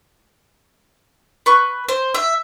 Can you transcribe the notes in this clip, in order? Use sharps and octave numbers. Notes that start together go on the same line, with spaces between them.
B4 C#6
C5
E5